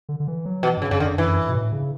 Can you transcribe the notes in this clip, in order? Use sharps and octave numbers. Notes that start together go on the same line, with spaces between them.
D3
D3
E3
F#3
B2 E3
G2 C#3
F#2 C#3
D3
F#2
F#2 E3
G2
B2
A2
C#3